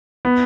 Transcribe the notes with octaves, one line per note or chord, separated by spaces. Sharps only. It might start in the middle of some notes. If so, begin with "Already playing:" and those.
B3